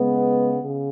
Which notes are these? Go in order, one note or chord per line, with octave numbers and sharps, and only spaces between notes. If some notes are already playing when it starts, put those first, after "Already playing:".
Already playing: C#3 G#3 B3
C#3